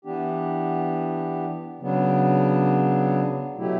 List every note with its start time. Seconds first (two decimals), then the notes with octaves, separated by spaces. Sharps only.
0.05 E3 B3 D4 G4
1.81 C#3 F#3 B3 D4
3.56 B2 F#3 A3 E4 G4